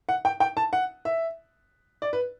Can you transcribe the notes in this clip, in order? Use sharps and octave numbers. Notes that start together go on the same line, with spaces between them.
F#5
G5
G5
A5
F#5
E5
D5
B4